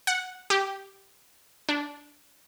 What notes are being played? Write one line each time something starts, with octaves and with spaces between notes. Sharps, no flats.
F#5
G4
D4